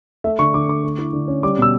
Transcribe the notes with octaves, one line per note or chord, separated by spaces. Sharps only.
A3 E5
D3 C#6
D3 D6
D4 D6
A3
E4
D3
C#4
G3 D6
B2 E6